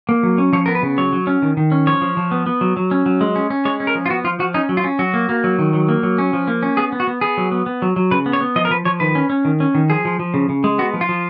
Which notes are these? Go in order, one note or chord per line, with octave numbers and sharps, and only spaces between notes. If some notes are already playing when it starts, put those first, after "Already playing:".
A#3
F#3
C#4
F3 C#5
B3 A#4
B4
C#3
F#3 C#5
F#3
C#4
D#3
D#3
C#4
F3 C#5
F3
F3
B3
B3
F#3
F#3
C#4
F#3
G#3
C#4
C#4
G#3 C#5
C#4
A#4
F3
F4
B3 F#4
F3 F4
F3 F#4
C#4 D#4
F#3
F4
C#4
F#3 F#4
A#3
A#3
F#3
D#3
F#3
A#3
F#3
C#4
F3
A#3
C#4
B3 G#4
B3
F#4
B3
B3 G#4
F#3
B3
B3
F#3
F#3
C#3 B4
B3
C#5
B3
F3 D#5
A#4
F3 B4
F3 C#5
D#3 B4
C#4
C#4
D#3
C#4
D#3
F3 G#4
F3
F3
C#3
C#3
G#3
B3 F#4
F3
F4
F3